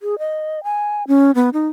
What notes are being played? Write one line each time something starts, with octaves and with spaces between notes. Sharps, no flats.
G#4
D#5
G#5
C#4
B3
D#4